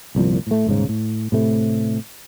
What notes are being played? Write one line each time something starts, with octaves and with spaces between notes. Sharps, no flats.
G1 C2 A#2 F3
A2 A3
D#1 G#2 C#3
A2
A2 C3 A3